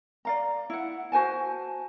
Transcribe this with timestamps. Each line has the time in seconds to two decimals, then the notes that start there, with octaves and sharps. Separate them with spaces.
0.25 D5 F5 A#5
0.70 E4 F#5
1.12 F#4 C5 G#5 A5